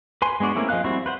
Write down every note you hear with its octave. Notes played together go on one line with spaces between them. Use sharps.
B4 G#5 C6
G#3 B3 D4 F#4 D5
A3 A#3 C4 C#4 E4
F3 G#4 D#5 F5 F#6
G3 C4 E4 F#4
B4 C5 F#5